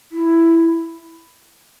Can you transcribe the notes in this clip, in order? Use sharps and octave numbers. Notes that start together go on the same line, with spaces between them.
E4